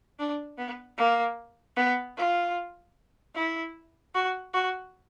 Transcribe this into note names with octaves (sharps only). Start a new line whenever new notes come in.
D4
B3
A#3
B3
F4
E4
F#4
F#4